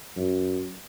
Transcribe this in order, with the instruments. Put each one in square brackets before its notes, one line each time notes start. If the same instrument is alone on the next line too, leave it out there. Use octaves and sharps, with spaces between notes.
[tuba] F#2